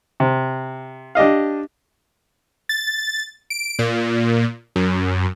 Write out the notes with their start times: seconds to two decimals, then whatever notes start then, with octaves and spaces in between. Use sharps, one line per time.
0.20 C3
1.15 D4 G4 D#5 F5
2.69 A6
3.50 D7
3.79 A#2
4.76 F#2